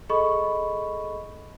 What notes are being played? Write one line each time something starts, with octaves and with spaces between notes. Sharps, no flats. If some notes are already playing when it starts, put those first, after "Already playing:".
G#4 A4 D#5 B5 C#6